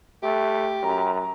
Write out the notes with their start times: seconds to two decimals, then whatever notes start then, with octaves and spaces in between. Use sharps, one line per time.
0.23 A3 G4
0.83 F#2 A#5